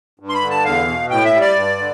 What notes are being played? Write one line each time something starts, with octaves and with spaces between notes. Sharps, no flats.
G2
C6
B5
D3
A5
E2 F5
B2
A2 G5
E5
G3
D5
G2
D3